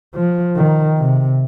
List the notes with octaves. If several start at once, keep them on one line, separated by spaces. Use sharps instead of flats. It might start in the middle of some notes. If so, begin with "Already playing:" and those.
F3
D#3
C3